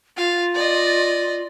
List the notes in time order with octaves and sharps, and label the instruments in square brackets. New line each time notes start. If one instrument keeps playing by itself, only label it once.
[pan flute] F4 [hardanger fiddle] F5
[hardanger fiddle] D5 D#5